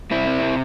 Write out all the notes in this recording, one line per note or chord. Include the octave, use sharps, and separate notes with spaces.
C3 C4 E4
C4
C3